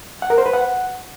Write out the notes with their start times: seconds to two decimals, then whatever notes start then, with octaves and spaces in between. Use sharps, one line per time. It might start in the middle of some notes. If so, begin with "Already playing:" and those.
0.22 F#5
0.30 A#4
0.38 C5
0.46 B4
0.53 F#5